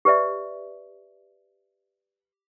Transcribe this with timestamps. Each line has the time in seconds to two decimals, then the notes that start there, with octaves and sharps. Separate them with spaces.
0.05 G4 B4 D5 E5